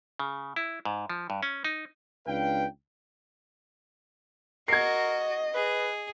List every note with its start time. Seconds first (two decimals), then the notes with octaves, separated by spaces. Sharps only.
0.20 C#3
0.56 E4
0.85 G#2
1.10 F3
1.30 G2
1.43 C#4
1.65 D#4
2.27 C#2 D4 B4 F5 G5
4.68 F#4 A#4 D#5 G#6 C7
5.54 G#4 B4